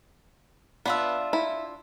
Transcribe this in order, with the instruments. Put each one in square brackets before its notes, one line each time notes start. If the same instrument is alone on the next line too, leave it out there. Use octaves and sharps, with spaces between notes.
[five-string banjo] B3 [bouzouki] D4 F4 E5
[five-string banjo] E4